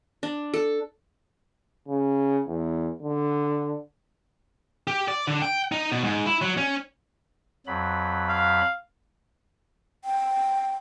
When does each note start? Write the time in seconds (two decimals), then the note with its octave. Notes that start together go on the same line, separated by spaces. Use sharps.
0.23 D4
0.54 A4
1.88 C#3
2.47 E2
3.03 D3
4.87 G4
5.08 D5
5.27 D3
5.42 G5
5.72 D#4
5.92 B2
6.04 G#2
6.26 E4
6.42 F#3
6.57 C#4
7.67 F2 F#3 B5
8.29 F5
10.05 G5